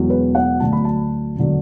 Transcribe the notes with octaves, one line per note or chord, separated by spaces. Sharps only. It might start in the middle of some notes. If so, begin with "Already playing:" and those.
Already playing: E1 E2 B2 F#3
B4
F#5
D2 D3 F#3 A5
B5
A5
E1 D3 F#3